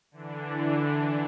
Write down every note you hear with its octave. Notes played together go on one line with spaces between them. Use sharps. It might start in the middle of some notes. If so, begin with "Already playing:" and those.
D3 E3 D4